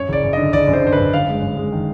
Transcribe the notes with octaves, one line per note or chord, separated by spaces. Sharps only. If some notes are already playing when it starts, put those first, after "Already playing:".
Already playing: F#2 C#5
F#1 D5
F#2
D3 D#5
F#1 D5
F#2
C5
D3 C5
B4
F#2
G1 F5
G#3
F#2
G#3
D#3